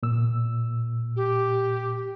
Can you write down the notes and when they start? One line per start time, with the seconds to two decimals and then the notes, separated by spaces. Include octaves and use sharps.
0.03 A#2 E6
1.16 G4